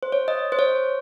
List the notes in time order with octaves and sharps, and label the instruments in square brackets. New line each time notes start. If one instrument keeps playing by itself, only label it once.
[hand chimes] C5
C#5
D#5
C5
C#5